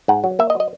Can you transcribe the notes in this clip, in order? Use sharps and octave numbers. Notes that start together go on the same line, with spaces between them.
G#2 F#5
F#3
A#3 E5
D#5
F#3
D#5